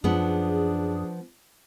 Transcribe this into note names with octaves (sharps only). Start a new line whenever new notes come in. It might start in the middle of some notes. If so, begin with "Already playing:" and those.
F#2 F3 B3 D4 G#4